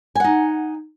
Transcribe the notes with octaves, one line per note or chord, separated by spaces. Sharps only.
D#4 F#5 G#5